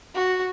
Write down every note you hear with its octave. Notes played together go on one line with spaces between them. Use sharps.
F#4